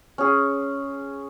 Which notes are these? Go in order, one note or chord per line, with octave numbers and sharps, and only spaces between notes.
C#4 G#4